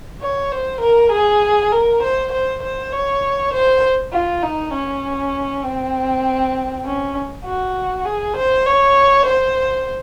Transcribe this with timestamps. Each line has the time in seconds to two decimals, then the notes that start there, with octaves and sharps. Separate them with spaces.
0.22 C#5
0.51 C5
0.81 A#4
1.11 G#4
1.72 A#4
2.03 C5
2.32 C5
2.63 C5
2.92 C#5
3.53 C5
4.13 F4
4.43 D#4
4.73 C#4
5.64 C4
6.85 C#4
7.45 F#4
8.05 G#4
8.36 C5
8.66 C#5
9.26 C5